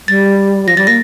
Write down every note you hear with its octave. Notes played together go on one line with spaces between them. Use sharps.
G3 A6
F3 A#6
G3 A6
A#3 A#6